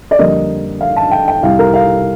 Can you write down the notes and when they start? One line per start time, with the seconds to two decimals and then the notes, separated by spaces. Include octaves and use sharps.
0.11 D5
0.19 F2 D3 G3 A#3 D#5
0.81 F5
0.96 A5
1.11 G5
1.28 G5
1.43 C2 C3 G3 F5
1.59 A#4
1.74 F5